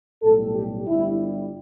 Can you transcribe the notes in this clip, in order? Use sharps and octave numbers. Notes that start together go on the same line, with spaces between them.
B1 A2 G3 A4
G4
G1 G2 G3 E4